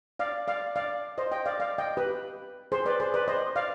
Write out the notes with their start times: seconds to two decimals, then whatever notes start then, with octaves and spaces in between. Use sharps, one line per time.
0.19 D5 F5
0.48 D5 F5
0.76 D5 F5
1.18 C5 D#5
1.32 D#5 G5
1.46 D5 F5
1.60 D5 F5
1.78 D#5 G5
1.97 G4 B4
2.72 G#4 C5
2.85 B4 D5
3.00 G#4 C5
3.14 B4 D5
3.28 C5 D#5
3.56 D5 F5